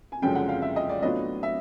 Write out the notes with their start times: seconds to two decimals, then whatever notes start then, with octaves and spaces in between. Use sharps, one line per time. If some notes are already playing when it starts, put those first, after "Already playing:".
0.12 G#5
0.22 F#1 F#2 D3 F3 G#3 G5
0.35 F#5
0.49 F5
0.62 E5
0.76 D#5
0.89 D5
1.02 A2 F#3 B3 D4 F4 D#5
1.43 E5